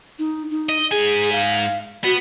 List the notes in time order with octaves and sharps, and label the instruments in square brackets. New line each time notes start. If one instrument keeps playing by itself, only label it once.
[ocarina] D#4
D#4
[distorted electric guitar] D#5
[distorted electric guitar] G#2 G#5 [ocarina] G#4
[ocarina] F5
[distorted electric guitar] B3 [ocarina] F#4